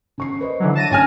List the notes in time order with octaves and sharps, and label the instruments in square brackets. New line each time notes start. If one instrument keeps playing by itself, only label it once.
[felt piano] C#3 C#6 C7
B4 C5 D#5
[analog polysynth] D3 E3 F#3
A5 A#6 D#7
[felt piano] D2 A#2 D3 [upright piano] C#4 G#5 F6